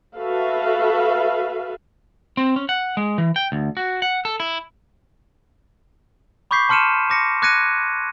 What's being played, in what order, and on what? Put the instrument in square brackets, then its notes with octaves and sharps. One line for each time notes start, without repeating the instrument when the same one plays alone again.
[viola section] F#4 A4 B4 E5 F5
[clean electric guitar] C4
C#4
F#5
G#3
E3
G5
D2
F#4
F#5
A4
E4
[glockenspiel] B5 C#6 D6 G6 B6 C7
A5 C6 F6 C#7 D#7 E7
D6 A#6 C#7
D6 F#6 G#6 A#6 C#7 D#7